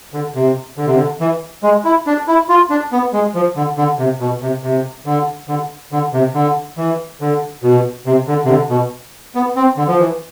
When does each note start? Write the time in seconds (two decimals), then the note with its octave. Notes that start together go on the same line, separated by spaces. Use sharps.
0.13 D3
0.35 C3
0.77 D3
0.86 C3
0.94 D3
1.20 E3
1.63 G#3
1.85 E4
2.07 D4
2.28 E4
2.49 F4
2.70 D4
2.92 B3
3.13 G#3
3.35 F3
3.56 D3
3.78 D3
3.99 C3
4.20 B2
4.42 C3
4.64 C3
5.06 D3
5.48 D3
5.92 D3
6.13 C3
6.35 D3
6.77 E3
7.21 D3
7.63 B2
8.06 C3
8.28 D3
8.45 C3
8.49 D3
8.70 B2
9.35 B3
9.56 C4
9.77 D3
9.88 F3
9.99 E3